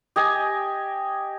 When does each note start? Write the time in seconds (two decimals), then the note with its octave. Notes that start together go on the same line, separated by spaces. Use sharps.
0.16 G4 D#5 G#5